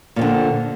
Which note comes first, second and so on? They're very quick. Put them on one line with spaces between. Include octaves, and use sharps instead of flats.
A#2 F2 D3